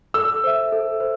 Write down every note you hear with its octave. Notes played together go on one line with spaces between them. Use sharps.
A4 E6
C5 E5
A4
C5